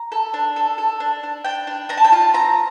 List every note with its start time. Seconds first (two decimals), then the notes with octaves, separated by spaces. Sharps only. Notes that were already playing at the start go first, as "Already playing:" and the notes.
Already playing: A#5
0.12 A4
0.34 D4
0.56 A4
0.78 A4
1.00 D4
1.23 D4
1.44 D4 G5
1.67 D4
1.89 D4 A#5
1.97 A5
2.04 G5
2.12 F4 A5
2.34 C4 A#5